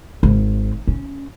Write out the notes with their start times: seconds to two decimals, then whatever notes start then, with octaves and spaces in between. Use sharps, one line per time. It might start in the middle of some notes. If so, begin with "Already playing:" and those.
0.23 G#1
0.87 C#4